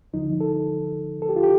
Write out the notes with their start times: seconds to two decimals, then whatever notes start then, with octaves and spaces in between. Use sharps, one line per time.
0.13 D2 D3 F3 D#4
0.41 A4
1.22 A4
1.29 G4
1.36 F4
1.43 G4